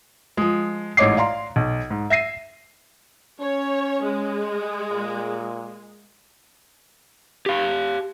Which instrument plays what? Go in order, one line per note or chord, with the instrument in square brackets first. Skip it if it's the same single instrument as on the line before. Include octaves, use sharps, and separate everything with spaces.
[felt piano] F3 G#3
A1 G#2 C#5 D#5 D6 C7
D5 F5 A#5 C6
B1
G#2
E5 A#6 C7 D#7
[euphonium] C#4 [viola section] C#5
[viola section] G#3
[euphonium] A#2
[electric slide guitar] G4 F5